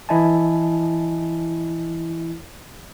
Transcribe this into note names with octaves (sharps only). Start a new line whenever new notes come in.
E3 E4 D#5 G#5 A5